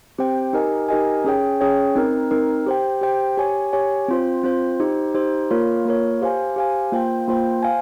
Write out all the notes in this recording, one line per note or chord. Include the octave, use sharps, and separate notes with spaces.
C4 G4 C5 G5
D#4 G4 A#4 D#5 G#5
D#4 G4 A#4 D#5 G#5
C#4 G#4 C#5 G5
C#4 G#4 C#5 G5
C4 D#4 A#4
C4 D#4 A#4
G4 C5 G5
G4 C5 G5
G4 C#5 G#5
G4 C#5 G#5
C4 F4 C5
C4 F4 C5
D#4 G4 C5
D#4 G4 C5
A#3 F4 A#4 C#5
A#3 F4 A#4 C#5
G4 C5 F5 G#5
G4 C5 F5 G#5
A#3 F4 C5 G5
A#3 F4 C5 G5
C5 F5 G#5